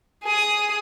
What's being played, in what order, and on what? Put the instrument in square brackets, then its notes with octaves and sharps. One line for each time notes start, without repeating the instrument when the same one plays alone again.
[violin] G#4 D#6